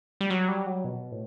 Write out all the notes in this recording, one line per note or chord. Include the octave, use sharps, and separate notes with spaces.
G3
F#3
G3
F#3
B2
A2